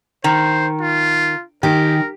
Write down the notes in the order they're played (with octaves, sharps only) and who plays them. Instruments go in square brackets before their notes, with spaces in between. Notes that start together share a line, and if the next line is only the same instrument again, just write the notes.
[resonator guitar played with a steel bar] D#3 [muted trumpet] C5
[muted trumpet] F4
[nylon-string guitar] D#3 G#5 [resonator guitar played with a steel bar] G4 [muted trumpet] A#4